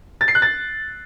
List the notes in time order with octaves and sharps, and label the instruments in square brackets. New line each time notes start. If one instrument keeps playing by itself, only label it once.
[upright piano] A6
C7
F#6
A6